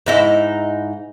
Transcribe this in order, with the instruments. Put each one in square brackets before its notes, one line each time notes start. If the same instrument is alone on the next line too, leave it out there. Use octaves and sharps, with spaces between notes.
[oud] G#2 D#4 E4